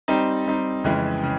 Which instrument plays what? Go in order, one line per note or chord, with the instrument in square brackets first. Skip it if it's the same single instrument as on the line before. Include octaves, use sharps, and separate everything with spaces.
[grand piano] G3 C4 D#4
G3 C4 D#4
F2 C#3 E3 G#3
C#3